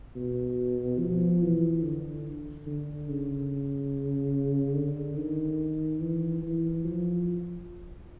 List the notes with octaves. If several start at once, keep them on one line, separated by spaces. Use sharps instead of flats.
B2
F3
E3
D3
D3
C#3
D3
D#3
E3
E3
F3